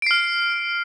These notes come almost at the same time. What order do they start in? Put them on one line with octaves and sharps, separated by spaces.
D7 C7 F6